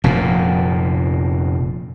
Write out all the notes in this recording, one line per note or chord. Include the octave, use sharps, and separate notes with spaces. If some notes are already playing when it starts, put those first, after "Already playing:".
F1 A#2